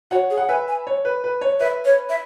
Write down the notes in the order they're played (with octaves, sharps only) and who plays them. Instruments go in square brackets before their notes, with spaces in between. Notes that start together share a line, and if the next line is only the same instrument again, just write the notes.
[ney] F#4 [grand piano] C#5 F#5
[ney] G#4
[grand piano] F#5
[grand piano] B4 E5 [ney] G#5
[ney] G#5
[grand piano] C#5
B4
B4
C#5
[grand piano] B4 [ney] E5
[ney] C#5
E5